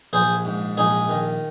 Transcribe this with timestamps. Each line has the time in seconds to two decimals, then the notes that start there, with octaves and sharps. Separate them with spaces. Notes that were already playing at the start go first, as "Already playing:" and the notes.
0.13 A#1 G#4 C5
0.45 G#2
0.77 A#1 D#4 G#4
1.09 D#3